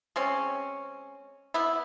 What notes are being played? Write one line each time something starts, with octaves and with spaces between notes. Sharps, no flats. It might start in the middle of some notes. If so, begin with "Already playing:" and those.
G#3 C4 C#4
B3 E4